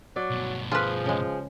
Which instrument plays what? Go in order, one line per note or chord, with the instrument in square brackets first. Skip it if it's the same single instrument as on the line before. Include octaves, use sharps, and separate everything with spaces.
[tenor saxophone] F#3 [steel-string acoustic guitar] D5
[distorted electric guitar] G2 B2
[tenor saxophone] F3 [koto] F4 B4 [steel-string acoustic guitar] G#4
[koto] C#3 G#3